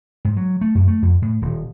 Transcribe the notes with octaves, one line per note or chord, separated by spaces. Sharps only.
G#2
F#3
A3
F#2
A3
F2
A2
D#1